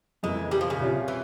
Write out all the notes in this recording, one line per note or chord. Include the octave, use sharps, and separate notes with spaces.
F2 C#3 E3 G#3 A#3 E4
G3
F3
C#3
C2 C3 G3 C#4 F4
E3